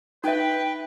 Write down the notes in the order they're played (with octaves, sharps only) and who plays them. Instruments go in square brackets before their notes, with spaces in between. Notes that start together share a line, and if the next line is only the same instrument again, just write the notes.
[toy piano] D#4 E5 [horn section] B4 [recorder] G5